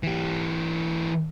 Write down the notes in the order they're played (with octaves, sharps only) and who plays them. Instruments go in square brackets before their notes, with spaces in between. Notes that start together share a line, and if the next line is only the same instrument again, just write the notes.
[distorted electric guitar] E3 G4